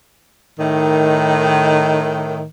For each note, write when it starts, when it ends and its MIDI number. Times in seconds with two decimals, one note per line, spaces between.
0.58 2.44 45
0.58 2.44 51